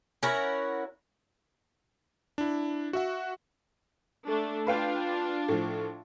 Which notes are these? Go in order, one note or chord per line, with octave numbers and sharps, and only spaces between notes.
C#4 E4 F#4 A#4
D4 E4
F#4 E5 F#5
A3 D4
D4 F4 B4 F5 G5
A2 F3